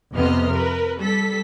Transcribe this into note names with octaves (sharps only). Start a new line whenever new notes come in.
F2 C3 B3 D#5 F6
A#4 B4
G3 A4 B6